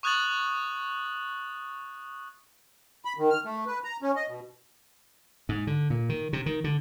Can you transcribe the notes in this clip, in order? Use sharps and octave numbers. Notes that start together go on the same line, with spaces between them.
C#6 D#6 F#6 G#6 A6 F#7
B5
D#3
F6
A3
B4
A#5
C#4
D#5
B2
G#2
D3
A#2
D#3
C3
D#3
D3